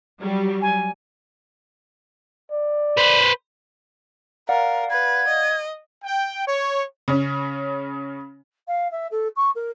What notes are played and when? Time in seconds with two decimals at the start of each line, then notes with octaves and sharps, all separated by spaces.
0.20 F#3 G3
0.62 G#5
2.51 D5
2.97 B4 C5
4.49 A#4 D5 F5 F#5
4.91 B4 G#6
5.28 D#5
6.04 G5
6.47 C#5
7.08 C#3 C#4
8.67 F5
8.91 E5
9.11 A4
9.36 C#6
9.55 A#4